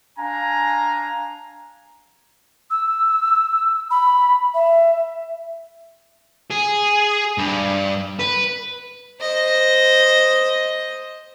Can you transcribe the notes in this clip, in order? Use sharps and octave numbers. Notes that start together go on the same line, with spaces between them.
D4 F5 G#5 A#5
E6
B5
E5
G#4
G2
B4
C5 D#5